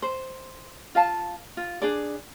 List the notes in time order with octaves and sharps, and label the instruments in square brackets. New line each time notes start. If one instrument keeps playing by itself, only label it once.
[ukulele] C5
F4 F5 A5
F4
D4 G#4 D5